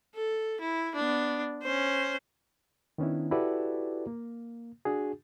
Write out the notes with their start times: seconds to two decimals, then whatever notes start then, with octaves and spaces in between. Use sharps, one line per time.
0.15 A4
0.61 E4
0.95 B3 D4
1.63 C#4 C5
2.98 D#3 B3 C#4 D4 E4
3.31 E4 F#4 G4 A4 B4 D5
4.07 A#3
4.85 D4 F#4 G#4